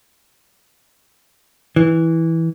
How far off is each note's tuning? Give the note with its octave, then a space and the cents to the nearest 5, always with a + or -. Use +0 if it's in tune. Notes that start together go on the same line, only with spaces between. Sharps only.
E3 -10